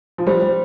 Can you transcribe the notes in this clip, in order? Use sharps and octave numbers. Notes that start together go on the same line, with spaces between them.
F3
G3 C5